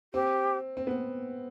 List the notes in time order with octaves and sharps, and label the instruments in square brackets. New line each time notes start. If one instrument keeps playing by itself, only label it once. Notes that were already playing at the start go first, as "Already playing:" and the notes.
[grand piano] C4 [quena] G4
[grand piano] C4
B3